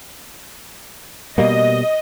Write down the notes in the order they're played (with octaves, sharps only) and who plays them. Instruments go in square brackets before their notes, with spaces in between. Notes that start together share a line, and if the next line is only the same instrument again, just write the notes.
[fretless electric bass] B2 G3 A#3 [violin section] D#5